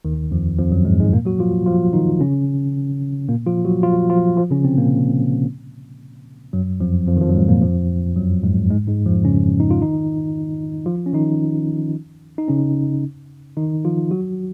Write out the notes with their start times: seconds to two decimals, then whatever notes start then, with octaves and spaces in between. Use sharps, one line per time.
0.05 D#2 D#3
0.31 F2 F3
0.58 F2 F3
0.72 F#2 F#3
0.85 G#2 G#3
1.00 G#2 G#3
1.13 A#2 A#3
1.26 F#3 F#4
1.39 F3 F4
1.66 F3 F4
1.93 D#3 D#4
2.20 C#3 C#4
3.28 A#2 A#3
3.47 F3 F4
3.65 F#3 F#4
3.83 F3 F4
4.10 F3 F4
4.37 F3 F4
4.51 C#3 C#4
4.64 C3 C4
4.77 A#2 A#3
6.53 F#2 F#3
6.81 F2 F3
7.08 F2 F3
7.17 D#3
7.21 F2 F3
7.29 F#3
7.34 G#2 G#3
7.48 A#2 A#3
7.61 F2 F3
8.16 F#2 F#3
8.43 G#2 G#3
8.70 G#2 G#3
8.88 G#2 G#3
9.06 F2 F3
9.24 C#3 C#4
9.60 D#4
9.71 F4
9.82 D#3 D#4
10.86 F3 F4
11.06 C#4
11.13 D#3 D#4
12.38 D#4
12.48 C#3 C#4
13.57 D#3 D#4
13.85 F3 F4
14.11 F#3 F#4